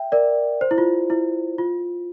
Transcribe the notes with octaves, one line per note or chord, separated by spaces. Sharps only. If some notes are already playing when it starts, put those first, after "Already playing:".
Already playing: E5 G5
A#4 D5
C5
E4
F4
E4
F4